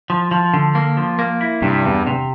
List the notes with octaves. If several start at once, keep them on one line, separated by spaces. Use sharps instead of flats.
F3
F3
D3
A#3
F3
A#3
E4
G2 C3
E2
C3